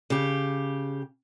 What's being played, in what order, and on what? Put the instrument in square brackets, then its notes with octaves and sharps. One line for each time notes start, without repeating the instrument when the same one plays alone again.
[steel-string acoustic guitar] C#3 G4